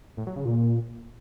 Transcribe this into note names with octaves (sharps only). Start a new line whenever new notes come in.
A2
F#3
C#3
A#2